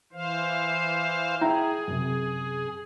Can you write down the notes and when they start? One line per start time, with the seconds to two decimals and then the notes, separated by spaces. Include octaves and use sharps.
0.13 E3 C5 F5
1.41 E4 G#4 G5 A#5
1.88 F#2 C3